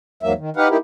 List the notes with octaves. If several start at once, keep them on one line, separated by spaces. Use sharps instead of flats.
E2 G#2 F#3 A#3 E5
D#3
D#4 G4 B4 F5 F#5
A#3 D#4 E4 G4